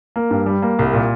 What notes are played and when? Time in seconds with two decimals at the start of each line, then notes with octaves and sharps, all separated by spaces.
0.16 A#3
0.31 G2
0.46 G3
0.62 A#3
0.79 C2
0.93 A#2